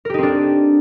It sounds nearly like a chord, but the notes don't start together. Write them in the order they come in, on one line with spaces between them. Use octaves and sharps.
A#4 G4 D#4 C4 D4